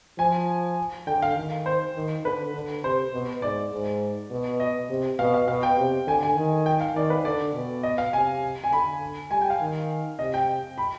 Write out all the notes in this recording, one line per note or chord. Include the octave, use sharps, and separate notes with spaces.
F3 G#5
D3 G5
F5
D#3
C5
D#3
D3 B4
D3
C3 C5
B2
G#2 D5
G#2
B2
D#5
C3
B2 F5
F5
B2 F5
G5
C3
D3 G#5
G#5
D#3
G5
F5
D#3 D5
B4
D3 D5
B2
D#5
F5
C3 G#5
G#5
D3 B5
G3 G#5
G5
F5
D#3
C3 D#5
G5
B5